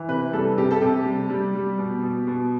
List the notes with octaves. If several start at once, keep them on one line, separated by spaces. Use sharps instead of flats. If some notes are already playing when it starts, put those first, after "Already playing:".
Already playing: E3
C3 B4
G3 A4
C3 G4
A4
C3 G4
G3
G3
G3
B2
B2
B2